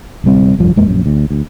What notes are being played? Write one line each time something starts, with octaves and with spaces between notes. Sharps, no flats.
D1 C3 G3 C4
F1 C2 G2 F3
D#1 F2 G#3 A#3
A#1 F#2
D2
D2